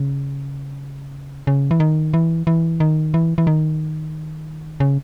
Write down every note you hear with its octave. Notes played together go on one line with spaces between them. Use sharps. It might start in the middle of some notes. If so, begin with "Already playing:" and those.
Already playing: C#3
C#3
E3
D#3
E3
E3
D#3
E3
E3
D#3
C#3